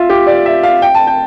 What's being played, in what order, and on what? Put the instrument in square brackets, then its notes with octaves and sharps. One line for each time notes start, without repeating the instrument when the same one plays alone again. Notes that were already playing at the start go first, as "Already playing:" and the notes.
Already playing: [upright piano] F4 E5
G4
D5
E5
F5
G5
A5
G5